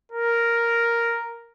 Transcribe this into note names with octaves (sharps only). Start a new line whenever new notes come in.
A#4